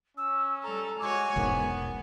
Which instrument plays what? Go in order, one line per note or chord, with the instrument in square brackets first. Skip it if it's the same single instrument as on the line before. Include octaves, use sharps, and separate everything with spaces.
[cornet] C#4 [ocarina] E6
[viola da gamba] G3 A4 [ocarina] A#5
[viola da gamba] G#3 F#4 C#5 [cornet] G#5 [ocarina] D6
[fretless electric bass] E1 B1 G#2 [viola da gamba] B3 [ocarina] A#4